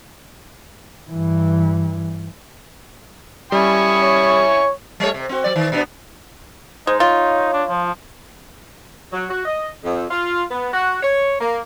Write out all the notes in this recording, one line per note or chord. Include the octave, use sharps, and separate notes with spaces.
G2 E3
G3 C#4 E4 G#5 B5 C#6 D#6
C#5
G3 A3 C#5
C3
C4 F#4
F#3 D5
D#3
B2 B3 D4
G#3 D#4 C5
F4 C#5
D4
F3
F#3
F#4
D#5
F2
F4
B3
F#4
C#5
A#3